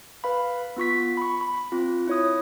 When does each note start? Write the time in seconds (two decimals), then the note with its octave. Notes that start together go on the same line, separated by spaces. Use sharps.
0.24 B4 F5 B5
0.76 B3 F4 C#6 B6
1.17 B5 C#6
1.41 B5
1.72 C4 F4
2.07 E4 C#5 D#6